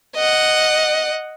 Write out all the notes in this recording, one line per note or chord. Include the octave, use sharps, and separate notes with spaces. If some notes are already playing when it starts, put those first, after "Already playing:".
D#5 F#5